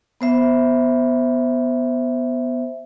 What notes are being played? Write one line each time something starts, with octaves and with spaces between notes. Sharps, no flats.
B3 C5 E5